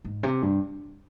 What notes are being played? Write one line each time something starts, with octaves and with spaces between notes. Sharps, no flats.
G#2
C3
G2